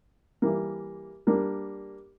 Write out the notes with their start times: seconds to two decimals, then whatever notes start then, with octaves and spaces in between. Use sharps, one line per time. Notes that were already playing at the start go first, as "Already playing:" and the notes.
0.42 E3 G3 A#3
1.27 G3 A#3 D4